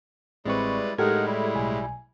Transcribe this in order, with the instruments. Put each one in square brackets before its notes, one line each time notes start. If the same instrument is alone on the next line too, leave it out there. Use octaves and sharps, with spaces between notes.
[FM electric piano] A1 C4 C#6 [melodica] G3 E4 D5 [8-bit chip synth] G#3 B4
[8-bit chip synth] A2 G#3 [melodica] D#4 A#4 F#5 [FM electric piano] G4 A4 G#6
[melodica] G3 E4
[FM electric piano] B1 G#5